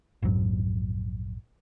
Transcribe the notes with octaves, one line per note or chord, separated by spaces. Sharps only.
A#1 F2 G#2 F#3